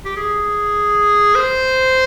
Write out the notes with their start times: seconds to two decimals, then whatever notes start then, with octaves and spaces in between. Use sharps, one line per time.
0.05 G4
0.17 G#4
1.35 C5